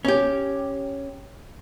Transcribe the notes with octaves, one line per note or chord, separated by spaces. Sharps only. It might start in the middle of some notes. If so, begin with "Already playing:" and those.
C#4 G4